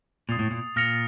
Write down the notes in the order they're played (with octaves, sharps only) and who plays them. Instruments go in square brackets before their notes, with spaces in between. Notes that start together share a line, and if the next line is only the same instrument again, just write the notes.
[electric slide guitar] A#2 [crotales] D#6 A6 C7 F7
[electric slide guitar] A2
A#2
[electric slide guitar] A#2 [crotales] F6 A#6 C#7 F7